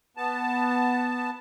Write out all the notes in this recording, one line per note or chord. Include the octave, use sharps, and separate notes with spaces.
B3 A5